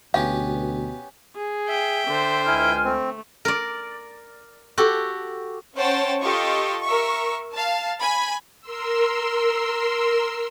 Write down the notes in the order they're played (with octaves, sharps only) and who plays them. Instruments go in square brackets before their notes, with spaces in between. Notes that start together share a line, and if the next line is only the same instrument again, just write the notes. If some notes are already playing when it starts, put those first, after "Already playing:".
[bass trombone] D2 [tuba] B2 [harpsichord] B3 C#4 G4 [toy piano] F5
[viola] G#4
[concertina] E5 [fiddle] G5
[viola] D3 C5
[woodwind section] C#2 G#5 F6 [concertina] E4
[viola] A3 [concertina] C4
[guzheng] A#4 D5
F#4 G4 A4
[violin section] C#4 C5 C#5 F#5 G5 A5
F4 G4 A4 D#5 C#6
A#4 E5 C#6
F5 A5
G#5 B5
[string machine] A#4 C6 E6